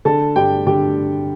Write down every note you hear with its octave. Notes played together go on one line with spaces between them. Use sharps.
D3 A4 A5
G2 G4 G5
D3 G4 G5